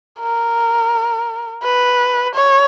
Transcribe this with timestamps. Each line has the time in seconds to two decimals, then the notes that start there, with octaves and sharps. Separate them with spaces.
0.20 A#4
1.63 B4
2.35 C#5